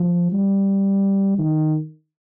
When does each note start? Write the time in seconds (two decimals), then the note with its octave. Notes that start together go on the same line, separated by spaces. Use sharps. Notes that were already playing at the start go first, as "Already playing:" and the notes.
Already playing: F3
0.32 G3
1.39 D#3